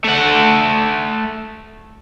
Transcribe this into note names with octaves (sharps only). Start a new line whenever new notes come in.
A3 F#5